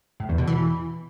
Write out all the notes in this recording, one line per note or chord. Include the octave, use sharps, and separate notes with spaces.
A2
E2
B2
E3